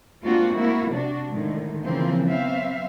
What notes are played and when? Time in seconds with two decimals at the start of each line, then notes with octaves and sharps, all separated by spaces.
0.23 G#3 A#3 C4 D4 F4 F#4
0.55 A#3 E4 F#4
0.93 C3 D4 F#4
1.29 A2 D3 D#3 G#3
1.84 C#3 E3 F3 A#3 C4
2.27 F#3 B3 C4 E5 F5